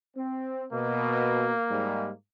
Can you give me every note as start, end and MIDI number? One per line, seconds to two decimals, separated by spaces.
0.17 0.65 60
0.73 1.51 47
0.73 2.12 58
1.70 2.10 44
1.70 2.10 55